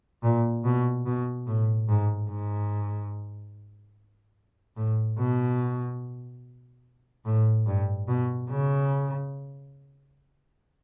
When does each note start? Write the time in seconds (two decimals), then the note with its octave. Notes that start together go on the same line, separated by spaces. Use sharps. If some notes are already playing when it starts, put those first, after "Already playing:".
0.23 A#2
0.65 B2
1.06 B2
1.47 A2
1.88 G#2
2.29 G#2
4.77 A2
5.19 B2
7.25 A2
7.66 G2
8.08 B2
8.49 C#3